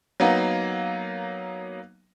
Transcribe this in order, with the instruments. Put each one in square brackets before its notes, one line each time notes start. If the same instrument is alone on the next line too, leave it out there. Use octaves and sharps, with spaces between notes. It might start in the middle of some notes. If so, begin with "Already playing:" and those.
[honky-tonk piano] F#3 A#3 B3 D#4